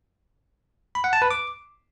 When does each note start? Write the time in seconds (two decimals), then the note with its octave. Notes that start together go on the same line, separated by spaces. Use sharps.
0.95 B5
1.04 F#5
1.13 A5
1.22 B4
1.31 D6